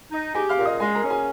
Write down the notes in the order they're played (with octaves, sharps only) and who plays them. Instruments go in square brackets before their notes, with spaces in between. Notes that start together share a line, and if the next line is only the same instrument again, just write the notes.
[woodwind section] D#4
[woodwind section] G4 [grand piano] G#4 G#5
[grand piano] F5 F6
[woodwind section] A#2
[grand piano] D#5 D#6
[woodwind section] G#3 [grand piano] G#4 G#5
[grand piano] A#4 A#5
[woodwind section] C#4
[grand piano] G#4 G#5